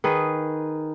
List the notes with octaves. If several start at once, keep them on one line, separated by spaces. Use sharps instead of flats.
D#3 G#4 B4